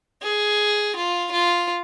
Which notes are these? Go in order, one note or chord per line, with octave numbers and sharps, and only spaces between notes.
G#4
F4
F4